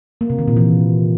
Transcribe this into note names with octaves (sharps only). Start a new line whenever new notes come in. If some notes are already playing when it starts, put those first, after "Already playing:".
A#3
C3
D#3
A#2
E3